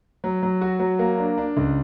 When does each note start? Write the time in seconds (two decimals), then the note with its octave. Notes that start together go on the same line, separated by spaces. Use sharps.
0.24 F#3
0.43 F#3
0.61 F#4
0.80 F#3
0.99 A#3
1.18 D4
1.38 D4
1.57 C#2